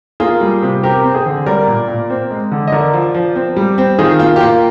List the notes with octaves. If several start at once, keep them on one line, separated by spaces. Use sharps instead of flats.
A#3 F4 G#4
G3
C3
C4 G4 A#4
C4
G#4 C5
D3
G3 A#4 D5
A#2
A#2
C4
G#3
D3
D#5
D3 A#4 D5
F3
F3
C4
G3
C4
D#3 F4 G#4
A#3 F4
G4
A#3 F4